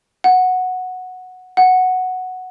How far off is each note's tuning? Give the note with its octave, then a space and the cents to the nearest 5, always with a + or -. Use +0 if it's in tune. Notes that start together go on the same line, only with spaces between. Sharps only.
F#5 -5
F#5 +0